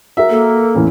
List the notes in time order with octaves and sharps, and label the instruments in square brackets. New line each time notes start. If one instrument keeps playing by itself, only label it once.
[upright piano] F#4 A#4 [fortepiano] E5
[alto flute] A#3 [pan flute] A4
[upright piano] E2 A2 C#4